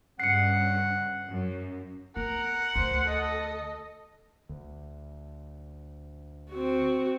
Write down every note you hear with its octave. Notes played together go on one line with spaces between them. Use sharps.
G2 C#3 F#5 C7 C#7
F#2
B3 A#4 F#5
D2 C5
A4 D#5
D2
C4 F#4